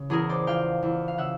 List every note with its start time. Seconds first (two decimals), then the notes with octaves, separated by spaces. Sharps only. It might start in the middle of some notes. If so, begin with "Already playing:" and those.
Already playing: C#3
0.10 E2 G#4 A#4
0.29 C5 D5
0.47 F3 F5 G5
0.83 E2
1.08 F5
1.17 C#3 E5 F#5